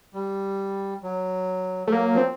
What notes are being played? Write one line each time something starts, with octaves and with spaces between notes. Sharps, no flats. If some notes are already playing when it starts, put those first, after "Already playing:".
G3
F#3
A3
F#3 A#3
F3
C4